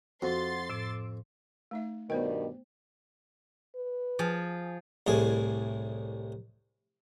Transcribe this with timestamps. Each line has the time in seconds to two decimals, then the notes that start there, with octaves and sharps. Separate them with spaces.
0.22 F2 F#4 C6 A6
0.70 A2 D6 E6
1.71 A3 D#4 E5
2.10 G2 B2 D#3 B3 C5 D5 G5
3.76 B4
4.19 F3 G#4
5.07 C2 A2 G#4